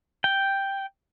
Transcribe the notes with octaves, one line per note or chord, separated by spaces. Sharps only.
G5